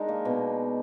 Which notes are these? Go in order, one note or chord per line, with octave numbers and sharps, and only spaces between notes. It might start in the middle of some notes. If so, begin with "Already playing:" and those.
Already playing: G#3 D4 D#4 A#4
A#3
B2